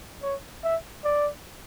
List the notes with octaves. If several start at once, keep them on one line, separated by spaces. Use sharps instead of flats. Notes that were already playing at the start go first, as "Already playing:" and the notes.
C#5
E5
D5